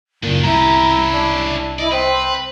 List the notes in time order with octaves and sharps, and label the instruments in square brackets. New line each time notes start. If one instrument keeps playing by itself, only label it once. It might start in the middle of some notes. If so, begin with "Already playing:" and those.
[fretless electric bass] F#1 A#2 [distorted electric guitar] D#3 D4
[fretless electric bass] C2 [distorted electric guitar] C#4 G4 [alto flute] E4 [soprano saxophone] A#5
[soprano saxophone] D4
[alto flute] E4 [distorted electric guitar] D5 [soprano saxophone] D#5
[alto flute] C4 [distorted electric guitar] B4 [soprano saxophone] C5